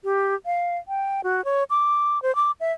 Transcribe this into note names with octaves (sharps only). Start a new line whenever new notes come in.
G4
F5
G5
F#4
C#5
D6
C5
D6
E5